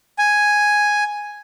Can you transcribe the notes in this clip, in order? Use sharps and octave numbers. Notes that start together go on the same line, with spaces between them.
G#5